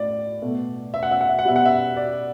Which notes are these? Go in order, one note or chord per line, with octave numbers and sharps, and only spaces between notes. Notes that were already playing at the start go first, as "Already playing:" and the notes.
Already playing: A2 D5
B2 A3
E5
F#5
E5
F#5
E5
F#5
B2 G3 E5
F#5
E5
D5